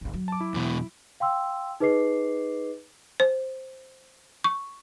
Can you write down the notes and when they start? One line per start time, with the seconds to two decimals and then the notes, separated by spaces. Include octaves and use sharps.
0.01 G#1 D#2
0.13 F#3
0.28 A5 D6
0.40 E4
0.54 E2 B2
1.20 F5 G5 C6 E6
1.80 D#4 G#4 B4 D#5 D6 C7
3.20 C5
4.44 C#6